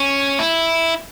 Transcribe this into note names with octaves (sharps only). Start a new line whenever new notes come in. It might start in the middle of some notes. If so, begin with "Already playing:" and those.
Already playing: C#4
E4